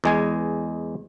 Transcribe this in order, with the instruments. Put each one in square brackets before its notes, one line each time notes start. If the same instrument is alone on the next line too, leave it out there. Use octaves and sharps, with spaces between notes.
[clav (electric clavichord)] E2 G#3 G#5